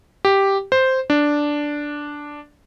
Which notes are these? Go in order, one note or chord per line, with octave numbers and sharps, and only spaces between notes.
G4
C5
D4